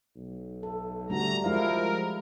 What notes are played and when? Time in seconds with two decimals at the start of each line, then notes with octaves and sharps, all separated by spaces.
0.15 B1
0.63 A4
1.10 D2 G3 A3 F#4 A#5
1.44 F3 G#3 E4 A#4 F5